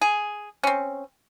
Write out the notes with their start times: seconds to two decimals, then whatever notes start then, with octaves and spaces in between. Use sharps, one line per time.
0.01 G#4
0.63 C4 C#4